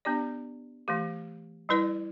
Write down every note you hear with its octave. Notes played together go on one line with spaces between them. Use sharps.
B3 D4 G4 D5
E3 A3 G4
G3 E4 B4 D5